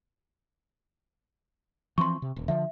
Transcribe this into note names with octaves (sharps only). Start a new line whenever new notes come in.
E3 F3 C4 C6 C#6
C3
D#1
D3 F3 E5